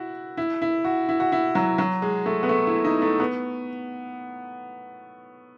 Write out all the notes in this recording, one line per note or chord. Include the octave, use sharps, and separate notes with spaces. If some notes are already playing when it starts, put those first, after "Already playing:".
Already playing: E4 F#4
E4
E4
F#4
E4
F#4
E4
F#3
F#3
G#3
A3
B3
A3
E4
D#4
A3
B3